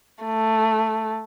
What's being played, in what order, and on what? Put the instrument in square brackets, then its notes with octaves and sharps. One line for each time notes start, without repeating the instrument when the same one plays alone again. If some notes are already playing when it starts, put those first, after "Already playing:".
[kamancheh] A3